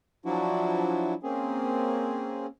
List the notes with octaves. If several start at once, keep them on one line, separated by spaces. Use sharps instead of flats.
F3 F#3 D4 E4 F#4
A#3 C4 C#4 G#4